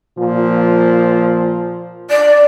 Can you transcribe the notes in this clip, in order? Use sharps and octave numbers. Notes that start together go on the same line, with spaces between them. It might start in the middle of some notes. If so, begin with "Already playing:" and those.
A#2 F3 F4
D5